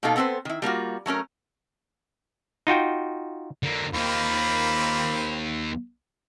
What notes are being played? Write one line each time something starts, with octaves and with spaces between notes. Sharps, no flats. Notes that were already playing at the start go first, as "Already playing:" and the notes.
B2 A#3 B3 D#4 A4 F5
B3 C4 A4 B4 C5
D#3 E4
G3 A#3 F4 F#4
F#3 A3 C#4 A#4
D#4 F4 F#4 G5
D3 A#3
D#2 D#3 A#3 C4 F4 B5